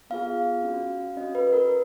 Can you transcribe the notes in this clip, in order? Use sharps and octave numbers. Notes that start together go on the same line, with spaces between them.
B3 F4 G#4 F5
C#4 F#4
C#4 F#4 D#5
B4
B4
A#4